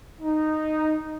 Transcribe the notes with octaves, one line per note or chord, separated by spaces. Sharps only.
D#4